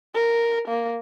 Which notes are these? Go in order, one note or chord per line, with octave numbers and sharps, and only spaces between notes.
A#4
A#3